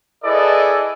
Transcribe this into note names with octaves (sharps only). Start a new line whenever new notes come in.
E4 G#4 A4 B4 D5 D#5